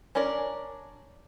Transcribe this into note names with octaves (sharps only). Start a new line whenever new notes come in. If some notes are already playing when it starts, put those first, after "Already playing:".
C#4 D4 A#4 D5